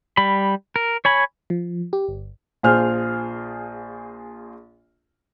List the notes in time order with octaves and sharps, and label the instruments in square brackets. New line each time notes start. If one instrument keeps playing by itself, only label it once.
[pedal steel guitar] G3 B5
A#4
C#5 G#5 B5
[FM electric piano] F3
G4
G1
[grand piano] A#1 F4 G#4 C5 F6